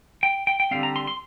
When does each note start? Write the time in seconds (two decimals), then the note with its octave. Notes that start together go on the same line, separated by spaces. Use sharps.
0.23 G5
0.47 G5
0.60 G5
0.71 D3 G3 C4 F5
0.83 A#5
0.96 C6
1.07 C6